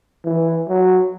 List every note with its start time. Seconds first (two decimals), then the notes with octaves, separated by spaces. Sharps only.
0.25 E3
0.68 F#3